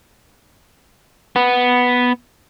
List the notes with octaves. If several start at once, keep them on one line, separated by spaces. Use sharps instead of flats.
B3